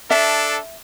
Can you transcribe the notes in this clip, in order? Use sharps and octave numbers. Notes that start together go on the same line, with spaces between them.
D4 A4 E5